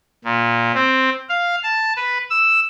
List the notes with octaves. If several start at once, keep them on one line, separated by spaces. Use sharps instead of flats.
A#2
C4
F5
A5
B4
E6